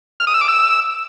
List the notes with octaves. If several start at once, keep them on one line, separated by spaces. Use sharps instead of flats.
F6
D#6
E6
D6
E6